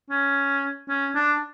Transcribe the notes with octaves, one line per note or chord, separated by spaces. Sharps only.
C#4
C#4
D4